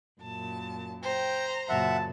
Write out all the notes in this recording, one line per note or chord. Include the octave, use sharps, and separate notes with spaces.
F#2 A#2 A5
C5 G5 A#5
F#2 A#2 C#3 E5 F#5 A5